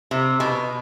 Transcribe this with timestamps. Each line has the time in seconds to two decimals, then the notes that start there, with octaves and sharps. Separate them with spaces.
0.11 C3
0.40 B2